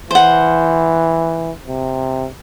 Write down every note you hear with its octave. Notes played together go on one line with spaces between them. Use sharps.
E3 C5 F#5
C3